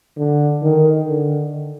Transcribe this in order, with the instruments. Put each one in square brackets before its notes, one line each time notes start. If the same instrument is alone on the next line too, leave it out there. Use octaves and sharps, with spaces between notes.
[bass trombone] D3
D#3
D3